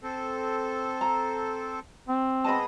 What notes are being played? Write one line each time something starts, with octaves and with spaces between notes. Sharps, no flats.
C4 A4
A#5
C4
G#3 B3 D#5 A5 B5